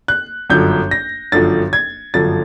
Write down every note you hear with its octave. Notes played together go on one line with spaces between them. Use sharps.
F#6
G1 F#2 D3 F3 G6
A#6
G1 F#2 D3 F3 A6
G#6
G1 F#2 D3 F3 A6